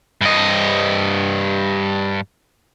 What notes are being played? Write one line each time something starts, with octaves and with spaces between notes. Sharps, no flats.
G2 D#5